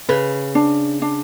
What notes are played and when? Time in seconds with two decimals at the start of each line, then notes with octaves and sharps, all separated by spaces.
0.09 C#3 B4
0.55 D4
1.02 D4